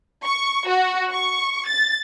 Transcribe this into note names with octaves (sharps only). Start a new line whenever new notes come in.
C#6
F#4
C#6
A6